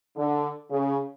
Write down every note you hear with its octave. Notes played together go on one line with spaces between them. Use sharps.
D3
C#3